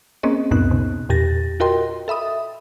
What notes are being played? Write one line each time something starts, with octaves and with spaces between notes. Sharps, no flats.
A#3 C4 C#4 G#4 D#5
C#2 F#2 A#2 B3 D#4 F#6
C3
E2 A#2 G4 A6 A#6
F4 F#4 A#4 D#5 G5 C6
A4 E5 B5 D#6